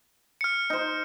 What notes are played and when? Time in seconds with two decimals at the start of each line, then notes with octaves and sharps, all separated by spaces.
0.41 F6 C#7
0.70 D#4 C5